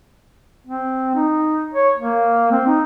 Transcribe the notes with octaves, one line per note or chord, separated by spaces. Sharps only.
C4
D#4
C#5
A#3
C4
D#4